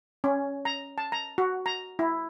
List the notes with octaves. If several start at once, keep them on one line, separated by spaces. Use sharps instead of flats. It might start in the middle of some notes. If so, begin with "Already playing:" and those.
C#4
A#5
A5
A#5
F#4
A#5
E4